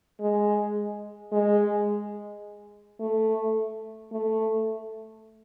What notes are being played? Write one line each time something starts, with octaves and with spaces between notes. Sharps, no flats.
G#3
G#3
A3
A3